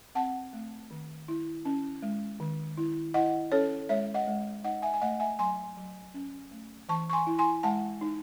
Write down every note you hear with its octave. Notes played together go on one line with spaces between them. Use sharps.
C4 F#5 A5
A3
D#3
E4
C#4
G#3
D#3
E4
E4 D#5 F#5
C#4 A4 C#5
G#3 C#5 E5
D#5 F#5
G#3
D#4 D#5 F#5
E5 G#5
G#5
A3 D#5 F#5
E5 G#5
F#3 G#5 C6
F#3
C#4
A3
E3 A5 C#6
C#6
G#5 C6
E4
G#5 C6
G#3 F#5 A5
D#4